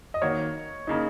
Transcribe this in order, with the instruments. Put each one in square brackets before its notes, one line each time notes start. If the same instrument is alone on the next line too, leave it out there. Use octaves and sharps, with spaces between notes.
[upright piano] D#5
[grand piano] D#3 A#3 F#4 [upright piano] C#5
[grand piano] C#3 A#3 [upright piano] D#4